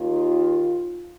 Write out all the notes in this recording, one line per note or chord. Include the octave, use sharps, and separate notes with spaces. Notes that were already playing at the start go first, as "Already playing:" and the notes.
Already playing: D#2 D#3 F4